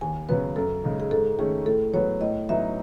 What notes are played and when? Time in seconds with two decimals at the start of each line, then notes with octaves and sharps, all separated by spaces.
0.01 D#2 G#5
0.29 C#3 F#3 B3 B4
0.56 F#2 A4
0.84 C#3 G#3 D#4
1.00 G#4
1.11 G#2 A4
1.39 D#3 A3 C#4 G#4
1.66 A2 A4
1.94 F#3 B3 C#5
2.21 A2 D#5
2.49 F#3 B3 D#4 E5